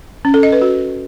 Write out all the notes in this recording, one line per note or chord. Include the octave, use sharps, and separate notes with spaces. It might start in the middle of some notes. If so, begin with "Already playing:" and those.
C#4
A4
D#5
B4
F#4